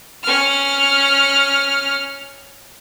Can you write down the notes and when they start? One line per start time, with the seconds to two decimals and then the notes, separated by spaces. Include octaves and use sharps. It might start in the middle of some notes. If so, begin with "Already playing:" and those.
0.23 C#4 F6